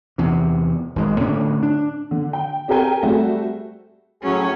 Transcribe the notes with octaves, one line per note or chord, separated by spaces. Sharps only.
E2 C3
G#1 F#2 G#3
A2 D3 C#4 D4
D4
D3
G5
C4 G4 A4 A#4 G5 G#5
G3 A3 C4 F#4 G#4
A2 F#3 C#4 G#4